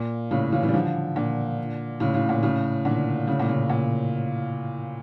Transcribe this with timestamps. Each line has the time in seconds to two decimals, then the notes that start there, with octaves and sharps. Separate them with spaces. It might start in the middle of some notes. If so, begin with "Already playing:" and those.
Already playing: A#2
0.31 A2 C#3
0.52 C#3 E3
0.63 C#3 E3
0.69 G3
0.74 D3 F3
1.16 A#2 D3
2.00 A2 C#3
2.14 A2 C#3
2.29 A#2
2.43 A2 C#3
2.85 A#2 D3
3.27 A2 C#3
3.39 A#2
3.48 A2 C#3
3.69 A#2